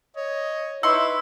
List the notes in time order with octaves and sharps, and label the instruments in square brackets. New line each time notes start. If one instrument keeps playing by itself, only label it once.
[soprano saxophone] C#5 [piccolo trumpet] D#5
[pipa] D#4 C6 C#6 [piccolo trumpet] E4 [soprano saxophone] B4 [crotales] E6